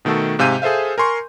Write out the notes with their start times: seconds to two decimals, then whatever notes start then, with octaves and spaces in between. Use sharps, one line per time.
0.05 B2 D#3 A3 F#4 A4
0.39 G#2 C3 F5 G#5 G6 D#7
0.62 G#4 A4 C5 E5 F5
0.98 A#4 G#5 C6 C#6